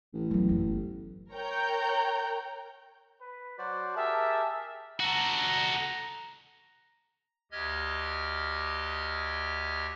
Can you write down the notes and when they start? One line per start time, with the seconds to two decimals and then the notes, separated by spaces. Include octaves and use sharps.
0.14 A1
0.31 F#3 B3
0.49 F#1
0.61 D3
1.33 A#4 C#5 G5 A#5 G6
3.21 B4
3.58 F#3 F#4 C5 D5
3.96 G4 G#4 A#4 E5 A5
5.00 F#4 A4 A#5
7.52 D2 G4 D#5 F6 G#6